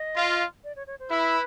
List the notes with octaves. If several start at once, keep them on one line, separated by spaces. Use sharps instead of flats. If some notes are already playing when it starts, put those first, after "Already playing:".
Already playing: D#5
F4
D5
C#5
C#5
C5
E4 B4